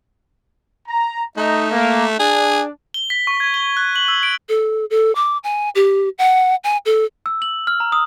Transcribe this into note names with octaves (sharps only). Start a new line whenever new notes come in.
A#5
A3 D#4
A#3
D4 G#4
G7
B6
C#6
G#6
G7
F#6
F#7
E6
D7
A4
A4
D6
G#5
G4
F#5
G#5
A4
E6
F#7
F6
A#5
D#6